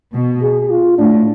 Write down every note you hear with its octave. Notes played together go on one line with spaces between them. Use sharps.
B2
G#4
F4
A2 D4